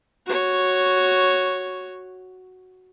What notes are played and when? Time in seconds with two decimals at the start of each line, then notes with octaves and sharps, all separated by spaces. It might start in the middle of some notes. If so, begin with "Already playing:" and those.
0.26 F#4 C#5